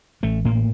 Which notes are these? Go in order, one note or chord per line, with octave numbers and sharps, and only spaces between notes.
A1 A3
A2 A#3